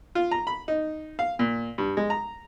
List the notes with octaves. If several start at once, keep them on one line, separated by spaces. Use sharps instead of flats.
F4
A#5
B5
D#4
F5
A#2
G2
G#3
A#5